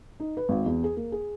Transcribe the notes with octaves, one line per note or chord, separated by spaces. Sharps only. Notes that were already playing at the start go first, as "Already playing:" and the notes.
D#4
B4
G#1
E2
G#4
A#3
G#4